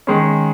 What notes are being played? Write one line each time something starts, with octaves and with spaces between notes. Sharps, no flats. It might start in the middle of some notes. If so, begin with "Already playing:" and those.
D#3 G#3 C#4